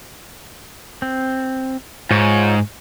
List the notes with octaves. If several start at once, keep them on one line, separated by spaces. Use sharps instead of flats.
C4
G#2 F4 C#5 C#6